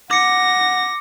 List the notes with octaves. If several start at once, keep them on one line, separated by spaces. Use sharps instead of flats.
F#5 D6 A#6 C#7